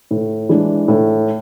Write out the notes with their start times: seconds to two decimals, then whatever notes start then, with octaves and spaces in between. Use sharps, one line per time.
0.11 A2
0.49 E3 G#3 D4
0.88 A2